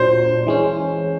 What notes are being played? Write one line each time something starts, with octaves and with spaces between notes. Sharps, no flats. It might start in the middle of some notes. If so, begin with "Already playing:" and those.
Already playing: A#2 F#3 D4 C5
E3 G#3 C#4